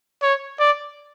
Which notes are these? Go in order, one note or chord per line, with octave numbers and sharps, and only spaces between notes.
C#5
D5